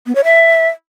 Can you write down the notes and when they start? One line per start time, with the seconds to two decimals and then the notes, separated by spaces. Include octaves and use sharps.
0.07 B3
0.15 C#5
0.24 E5